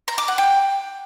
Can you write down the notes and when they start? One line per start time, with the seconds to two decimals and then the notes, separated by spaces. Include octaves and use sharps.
0.08 A#5
0.18 D6
0.28 F#5
0.38 G5